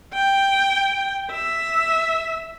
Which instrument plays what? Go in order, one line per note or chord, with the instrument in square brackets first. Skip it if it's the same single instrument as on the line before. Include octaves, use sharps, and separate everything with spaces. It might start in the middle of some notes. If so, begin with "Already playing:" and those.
[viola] G5
E5